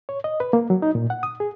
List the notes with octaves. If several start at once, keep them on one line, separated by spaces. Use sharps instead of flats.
C#5
D#5
B4
A#3
F#3
D#4
A#2
F#5
D#6
G#4